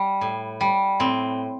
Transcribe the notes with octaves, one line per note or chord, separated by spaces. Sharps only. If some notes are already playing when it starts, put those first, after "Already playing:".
Already playing: G3
A2
G3
A2 C4